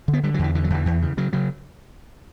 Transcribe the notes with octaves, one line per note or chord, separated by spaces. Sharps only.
D3
B3
D3 G3
F#3
E2 E3
D3 E3
F#3
E2 E3
E2
C#3
C#3 F#3
C#3 F#3